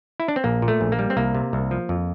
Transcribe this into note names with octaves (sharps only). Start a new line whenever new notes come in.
E4
D4
C4
A#1 A#3
A#2
A3
A#1
A#3
G3
C4
C2 A#3
C3
C2
F3
F2